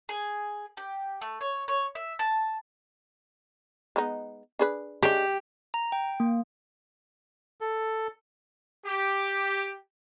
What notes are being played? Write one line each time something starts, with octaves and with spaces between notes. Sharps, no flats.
G#4
G4
A3
C#5
C#5
E5
A5
G#3 B3 D#4
D4 G#4 B4
G#3 D4 G4 C#5
A#5
G5
A#3
A4
G4